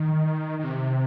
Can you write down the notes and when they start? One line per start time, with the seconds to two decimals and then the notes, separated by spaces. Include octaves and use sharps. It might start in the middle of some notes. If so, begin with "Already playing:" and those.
Already playing: D#3
0.59 D#3
0.64 C3